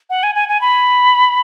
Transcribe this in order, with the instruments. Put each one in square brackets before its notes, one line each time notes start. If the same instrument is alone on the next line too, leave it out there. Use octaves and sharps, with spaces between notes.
[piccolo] F#5
G#5
G#5
G#5
B5